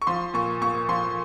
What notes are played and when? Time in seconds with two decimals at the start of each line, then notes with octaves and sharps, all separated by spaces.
0.02 C#6
0.07 F3 C6
0.34 A#2 C#6
0.61 A#2 C#6
0.89 F3 C6